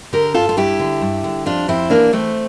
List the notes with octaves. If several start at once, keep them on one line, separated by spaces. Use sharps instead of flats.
D3 G4 A#4
G2 F4 A4
F4
G2 E4 G4
D3
G2
D3
F2 D4 F4
F2 C4 E4
E3 A#3 D4
E3 A3 C4